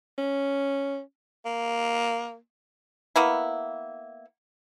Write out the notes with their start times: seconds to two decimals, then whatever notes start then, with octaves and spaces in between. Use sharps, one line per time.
0.18 C#4
1.46 A#3
3.16 A#3 B3 E4